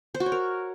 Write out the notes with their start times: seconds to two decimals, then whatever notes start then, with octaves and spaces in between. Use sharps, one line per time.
0.15 C5
0.20 F#4
0.26 C#5
0.32 A#4